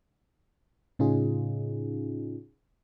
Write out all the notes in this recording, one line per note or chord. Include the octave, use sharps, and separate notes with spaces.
A2 C#3 C#4 D#4 F4 G#4